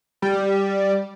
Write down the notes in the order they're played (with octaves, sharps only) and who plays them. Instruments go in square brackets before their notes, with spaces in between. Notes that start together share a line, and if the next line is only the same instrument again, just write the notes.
[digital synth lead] G3